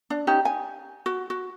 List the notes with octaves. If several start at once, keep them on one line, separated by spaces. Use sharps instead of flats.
D4
C#4 D#4 G4
G#5
F#4
F#4